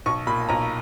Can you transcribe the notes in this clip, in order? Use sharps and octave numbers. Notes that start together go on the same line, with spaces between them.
B1 C#6
A#2 B5
B1 A#5